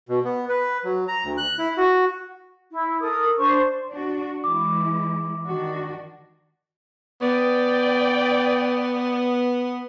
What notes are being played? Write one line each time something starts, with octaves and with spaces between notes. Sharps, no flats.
B2
B3
B4
F#3
A#5
D2
F#6
E4
F#4
E4
A4 A#4 D#6
D4 C5 C#6
D4 F#4
E3 G#3 E4 D6
D#3 D4 F#4
B3 D5 G5